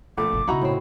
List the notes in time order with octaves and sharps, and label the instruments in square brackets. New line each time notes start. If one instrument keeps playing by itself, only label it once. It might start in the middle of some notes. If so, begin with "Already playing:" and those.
[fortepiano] A#1 A3 [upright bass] B2 [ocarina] D6
[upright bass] G1 B2
[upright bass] B1 C#3 [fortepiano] D#4 A#5 [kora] E4 F#4
[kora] A2 C4 [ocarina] C#5